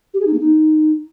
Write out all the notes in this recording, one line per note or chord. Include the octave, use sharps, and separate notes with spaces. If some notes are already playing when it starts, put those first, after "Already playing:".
G4
G#4
D#4
A#3
D#4